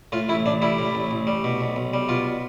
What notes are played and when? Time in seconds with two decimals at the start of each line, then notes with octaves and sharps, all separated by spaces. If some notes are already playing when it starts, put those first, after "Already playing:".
0.12 A2 F4
0.29 A1 E4
0.46 A1 D4
0.62 G3 E4
0.78 A2
0.95 A1
1.11 A1
1.27 G3
1.44 B2
1.61 B1
1.76 B1
1.94 G3
2.09 B2 F4